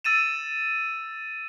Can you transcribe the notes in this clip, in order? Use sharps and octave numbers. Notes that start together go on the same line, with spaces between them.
E6 A6 D#7 E7